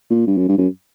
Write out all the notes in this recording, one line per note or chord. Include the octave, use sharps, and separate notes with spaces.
A#2
G2
F#2
G2
F#2